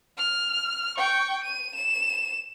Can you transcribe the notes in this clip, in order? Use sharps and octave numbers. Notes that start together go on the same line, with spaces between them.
F6
G5 C#6
D#7
E7